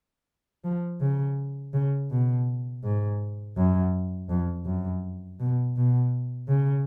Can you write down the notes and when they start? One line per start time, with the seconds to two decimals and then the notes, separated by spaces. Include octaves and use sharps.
0.65 F3
1.01 C#3
1.74 C#3
2.11 B2
2.84 G#2
3.57 F#2
4.30 F2
4.66 F#2
5.40 B2
5.76 B2
6.49 C#3